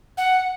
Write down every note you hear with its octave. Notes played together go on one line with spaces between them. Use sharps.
F#5